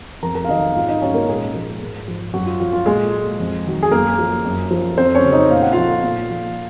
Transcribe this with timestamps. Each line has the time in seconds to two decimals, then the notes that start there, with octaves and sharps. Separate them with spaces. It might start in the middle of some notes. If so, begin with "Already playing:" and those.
0.23 F2 A#4 A#5
0.35 A#4 A#5
0.45 F5
0.49 D#3 F#3 D#4 D#5
0.75 G#2 F4 F5
0.89 D#4 D#5
1.01 F#3 C#4 C#5
1.14 A#3 A#4
1.28 A#2 G#3 G#4
1.55 F3
1.81 G#2
2.08 F3
2.33 F#2 F#3 F#4
2.46 F4
2.60 F3 F4
2.73 F4
2.86 A#2 G#3 G#4
3.12 F#3
3.39 F2
3.65 D#3 F#3
3.83 G#4
3.91 F#2 A#3 A#4
4.19 F3
4.45 F#2
4.71 F3
4.98 F2 C4 C5
5.15 C#4 C#5
5.24 C#3 F#3
5.32 D#4 D#5
5.51 A#2 F5
5.62 F#5
5.73 F3 F4 F5
6.03 A#2
6.30 F3